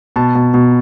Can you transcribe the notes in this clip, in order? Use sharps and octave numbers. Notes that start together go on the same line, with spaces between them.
B2 A5
B2
B2